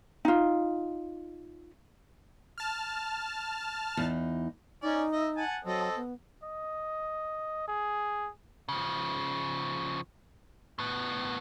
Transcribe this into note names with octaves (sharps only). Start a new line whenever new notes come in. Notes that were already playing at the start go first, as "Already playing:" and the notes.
D#4 F4
A5 F6
E2 D#4
C#4 D#4 D5
D#5 E5
F#5 G#5 A5
F#3 C4 A4 D#5
B3
D#5
G#4
C#3 F3
A2 B3